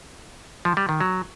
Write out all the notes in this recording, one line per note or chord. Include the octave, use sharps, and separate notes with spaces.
F3
G3
D#3
F#3